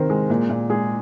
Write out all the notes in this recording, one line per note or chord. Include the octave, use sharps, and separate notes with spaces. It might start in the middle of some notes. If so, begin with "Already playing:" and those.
Already playing: C3 D#3 C4 A#4 C5
G#3
A#2
A#2
G#3 G#4